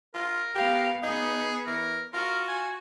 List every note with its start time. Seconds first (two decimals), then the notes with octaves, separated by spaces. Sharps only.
0.15 F4 A#4
0.55 B3 G4 F5
1.03 B3 D#4 G#4
1.66 E3 A#4
2.14 F4 F#4 A#4
2.48 G#5